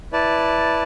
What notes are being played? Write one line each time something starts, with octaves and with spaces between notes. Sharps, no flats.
E4 B4 D5 A5